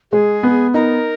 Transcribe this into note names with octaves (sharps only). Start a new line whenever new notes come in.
G#3 G#4
B3
D#4 A#4